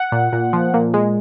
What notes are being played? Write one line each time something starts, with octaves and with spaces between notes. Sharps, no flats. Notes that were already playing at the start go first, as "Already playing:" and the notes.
Already playing: F#5
A#2
A#2
F3
A#2
G#3